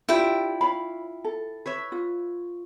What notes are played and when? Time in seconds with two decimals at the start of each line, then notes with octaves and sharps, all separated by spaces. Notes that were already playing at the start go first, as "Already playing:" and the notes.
0.09 D4 E4 F4 G4 D5 G5
0.61 C#5 F5 B5
1.24 A4
1.66 B4 C#5 E5
1.92 F4